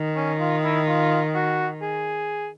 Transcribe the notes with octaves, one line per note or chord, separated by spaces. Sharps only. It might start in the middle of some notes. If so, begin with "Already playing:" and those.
Already playing: D#3
C#4
F4
E4
F4
F#4
G#4